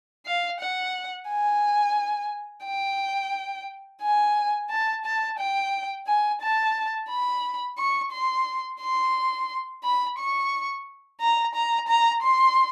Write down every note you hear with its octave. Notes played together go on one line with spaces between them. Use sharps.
F5
F#5
G#5
G5
G#5
A5
A5
G5
G#5
A5
B5
C#6
C6
C6
B5
C#6
A#5
A#5
A#5
C6